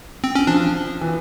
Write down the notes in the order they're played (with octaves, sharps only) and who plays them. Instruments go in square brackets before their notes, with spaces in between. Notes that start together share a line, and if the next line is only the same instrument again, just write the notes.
[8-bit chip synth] C4
C#4
[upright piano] F3 [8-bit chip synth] D4
[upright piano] E3